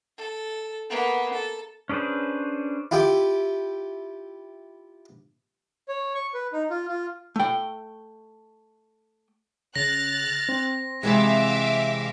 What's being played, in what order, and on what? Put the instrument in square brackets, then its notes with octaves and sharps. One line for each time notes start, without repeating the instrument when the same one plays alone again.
[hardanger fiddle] A4
A#3 B3
A4
[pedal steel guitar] C#4 D4 G#4 B4 C5
[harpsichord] E4 F4 G4 G5 D6
[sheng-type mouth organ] C#5
C#6
B4
D#4
F4
F4
[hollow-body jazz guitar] A3 G5
[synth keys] C#3 [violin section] F6 F#6 A6 [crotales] A#6
[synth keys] C4
[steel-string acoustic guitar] C3 E3 G#3 [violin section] E5 F5 D6